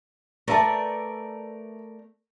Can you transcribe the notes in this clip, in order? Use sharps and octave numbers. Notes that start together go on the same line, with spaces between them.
A3 A#4 B4 D5 E5 A5